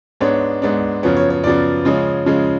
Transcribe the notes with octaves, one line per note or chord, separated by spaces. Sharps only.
G#2 G#3 B3 D4 C#5
G#2 G#3 B3 D4
F#2 C#3 F3 B3 C#5
C#5
C#5
F#2 C#3 F3 B3 D5
C#3 F3 G#3 C#4
C#3 F3 G#3 C#4